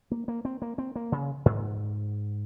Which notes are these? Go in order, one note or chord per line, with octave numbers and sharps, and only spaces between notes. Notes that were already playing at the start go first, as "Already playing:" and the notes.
A#3
A#3
C4
A#3
C4
A#3
C#3
G#2